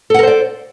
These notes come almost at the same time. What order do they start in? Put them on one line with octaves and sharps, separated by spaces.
A4 F#5 A#4 C5 D5